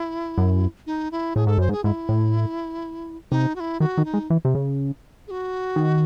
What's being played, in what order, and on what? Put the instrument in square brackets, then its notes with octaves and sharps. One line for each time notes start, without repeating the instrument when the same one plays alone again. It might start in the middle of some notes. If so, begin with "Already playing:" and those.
Already playing: [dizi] E4
[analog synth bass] F#2
[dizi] D#4
E4
[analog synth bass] A2 [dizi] G#4
[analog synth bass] G#2 [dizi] A4
[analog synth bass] F#2 [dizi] C5
[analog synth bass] G#2
[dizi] G#4
[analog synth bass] G#2 [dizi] E4
[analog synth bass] A2
[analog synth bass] C3 [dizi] D#4
[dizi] F#4
E4
[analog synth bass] D#3 [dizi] F#4
[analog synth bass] D#3
[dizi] D#4
[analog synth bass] G#3
E3
C3
C#3
[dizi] G#4
F#4
[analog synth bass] D#3